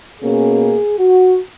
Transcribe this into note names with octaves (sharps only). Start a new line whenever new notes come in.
B2 A#3 C#4 G#4
F#4